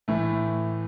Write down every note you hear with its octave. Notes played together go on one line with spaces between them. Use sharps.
A2 E3 A3